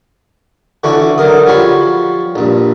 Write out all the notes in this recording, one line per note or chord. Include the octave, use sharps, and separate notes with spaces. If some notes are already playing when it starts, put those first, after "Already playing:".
D3 E3 C#4 D4 E4 F#4
D3 F#3 A#4 D#6
F3 G3 F#4 C#5 F5 B5
A#1 G2